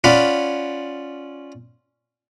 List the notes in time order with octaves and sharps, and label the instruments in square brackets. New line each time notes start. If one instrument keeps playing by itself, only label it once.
[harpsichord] C#4 F4 D5 F#5 B5